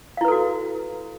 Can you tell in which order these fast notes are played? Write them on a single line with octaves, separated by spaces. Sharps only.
F5 E4 B4 A4 F#4